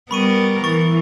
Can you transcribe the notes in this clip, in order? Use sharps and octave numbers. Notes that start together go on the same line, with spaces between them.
G3 B3 A#4 B5 C#6 D#7
E3 C#6 A6